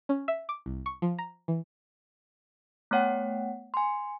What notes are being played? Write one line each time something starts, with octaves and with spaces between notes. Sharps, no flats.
C#4
E5
D6
C2
C#6
F3
A#5
E3
A3 B3 C#5 F#5 G5
G#5 C6